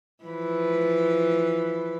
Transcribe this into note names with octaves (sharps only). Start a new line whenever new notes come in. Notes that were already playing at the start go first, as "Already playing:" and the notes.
E3 F3 B4